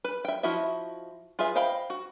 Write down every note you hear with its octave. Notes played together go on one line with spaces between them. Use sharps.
B4
E5 G5
F3 E4 F#4 D#5 E5
F4 G#4 B4 E5
C5 D#5 F5 G5 B5
F#4